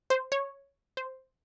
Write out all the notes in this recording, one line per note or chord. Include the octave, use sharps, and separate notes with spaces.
C5
C#5
C5